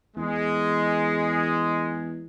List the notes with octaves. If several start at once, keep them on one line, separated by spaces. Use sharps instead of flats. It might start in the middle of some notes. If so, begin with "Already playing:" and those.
E2 G#3